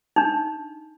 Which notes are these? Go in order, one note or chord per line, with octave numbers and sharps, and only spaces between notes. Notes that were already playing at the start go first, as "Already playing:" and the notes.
D4 D#4